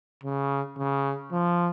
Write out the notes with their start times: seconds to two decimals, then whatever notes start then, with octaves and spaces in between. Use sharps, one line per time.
0.24 C#3
0.77 C#3
1.32 F3